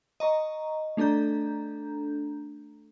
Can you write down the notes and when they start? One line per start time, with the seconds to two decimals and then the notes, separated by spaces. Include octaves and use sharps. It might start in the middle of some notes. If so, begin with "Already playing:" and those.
0.20 D#5 A#5 C#6
0.97 A3 D4 A4 A#5 G6